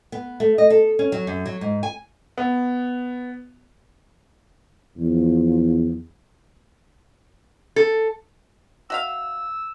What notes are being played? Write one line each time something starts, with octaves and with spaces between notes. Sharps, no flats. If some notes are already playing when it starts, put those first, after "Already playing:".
B3
A3
D#5
A4
C#4
F#3
F#2
F#3
G#2
G#5
B3
E2 F3
A4
F#4 E5 F5 E6